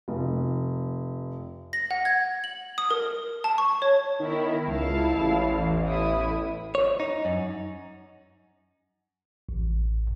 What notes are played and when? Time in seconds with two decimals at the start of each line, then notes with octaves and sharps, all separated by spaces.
0.08 F1
1.73 A#6
1.91 F#5
2.05 G#6
2.44 F#7
2.78 D#6
2.90 A#4
3.44 A5
3.58 C#6
3.82 C#5
4.20 D#3 B3 E4 A#4
4.67 C#2 E4 F5 A5
5.12 A1
5.54 E2
5.85 E4 D#6
6.75 C#5
7.00 D#4
7.25 F#2
9.49 A1